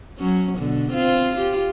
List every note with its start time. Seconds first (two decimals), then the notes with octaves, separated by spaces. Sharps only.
0.19 F#3 C#4
0.58 B2 D3
0.92 C4 F4
1.36 F4 G4